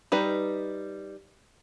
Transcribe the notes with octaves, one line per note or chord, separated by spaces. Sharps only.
G3 D#4 B4